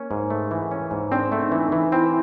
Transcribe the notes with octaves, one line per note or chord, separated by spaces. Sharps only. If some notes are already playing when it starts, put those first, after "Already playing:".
Already playing: A#3 C#4
G#2
A3
E3
C#4
G#2
C4 D4
A3
D#4
E3
D#4
E3
C4 E4